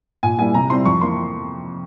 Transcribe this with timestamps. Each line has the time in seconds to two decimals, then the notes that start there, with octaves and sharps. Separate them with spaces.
0.23 A#2 G#5
0.38 G3 A#3 E4 G#5
0.54 C3 A#5
0.70 G3 C4 E4 C6
0.86 F2 C#6
1.01 E3 A#3 C6